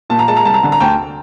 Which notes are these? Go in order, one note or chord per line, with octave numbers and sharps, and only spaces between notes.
A#2 A5
A#5
G#3 A5
A#5
C2 A5
A#5
D3 A5
A#5
D2 G5 A5